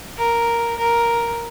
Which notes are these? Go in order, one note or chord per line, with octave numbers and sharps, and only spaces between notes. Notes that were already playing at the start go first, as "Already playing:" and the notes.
A#4
A#4